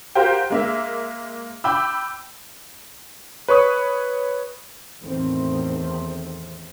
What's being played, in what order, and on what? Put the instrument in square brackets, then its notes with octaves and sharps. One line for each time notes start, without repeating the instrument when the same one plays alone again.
[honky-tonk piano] F#4 G4 A#4 C5 F5 G5
G#3 A#3 E5
G5 B5 D6 E6
[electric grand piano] B4 C#5 C#6 D#6
[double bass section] E2 A2 D#3 A3 C4